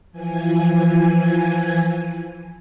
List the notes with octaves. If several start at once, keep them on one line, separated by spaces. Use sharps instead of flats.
E3 F3 G#5